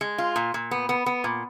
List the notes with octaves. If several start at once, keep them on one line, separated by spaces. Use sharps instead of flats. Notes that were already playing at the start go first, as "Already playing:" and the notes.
G#3
F4
A#2
A#2
B3
B3
B3
A#2